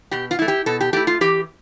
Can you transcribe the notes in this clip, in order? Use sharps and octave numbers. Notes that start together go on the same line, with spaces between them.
B2 G4
F4
A3 E4
G4
B2 A4
G4
A3 E4 G4
F4
E3 G4